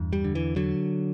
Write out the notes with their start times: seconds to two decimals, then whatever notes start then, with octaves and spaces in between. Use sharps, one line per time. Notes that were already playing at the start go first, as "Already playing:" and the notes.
Already playing: E2 G2
0.13 G3
0.24 D3
0.35 E3
0.56 D3 F#3